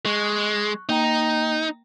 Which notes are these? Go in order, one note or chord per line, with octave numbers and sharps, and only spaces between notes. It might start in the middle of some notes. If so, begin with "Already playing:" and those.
G#3 C#6 F#6
A#3 D#4 G5 A#5